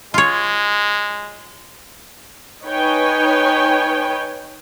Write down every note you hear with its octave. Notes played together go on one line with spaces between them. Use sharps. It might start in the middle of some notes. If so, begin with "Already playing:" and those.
G#3 F4 C#5
D#4 B4 C#5 G5 G#5